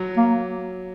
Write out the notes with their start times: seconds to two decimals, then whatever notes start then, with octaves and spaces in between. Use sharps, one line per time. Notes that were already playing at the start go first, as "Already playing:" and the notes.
Already playing: F#3
0.17 A#3